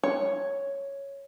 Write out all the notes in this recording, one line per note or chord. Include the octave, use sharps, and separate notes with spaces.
C#5